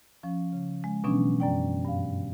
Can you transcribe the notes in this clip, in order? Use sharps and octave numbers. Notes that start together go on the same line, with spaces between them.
F3 C#4
C#3
G#3
B2 E3 F#3 B3 C#4 D4
F#2 D5 G5
G2 F5